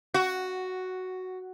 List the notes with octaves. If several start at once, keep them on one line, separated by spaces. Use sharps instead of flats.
F#4